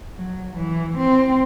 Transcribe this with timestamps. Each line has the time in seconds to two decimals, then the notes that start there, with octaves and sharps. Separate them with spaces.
0.17 F#3
0.57 E3
0.97 C4